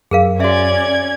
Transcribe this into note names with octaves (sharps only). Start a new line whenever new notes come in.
F#2 G#4 A#4 F5
C#4 F#4 D5 E5 G#6